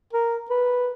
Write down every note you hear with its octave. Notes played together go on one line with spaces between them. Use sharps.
A#4
B4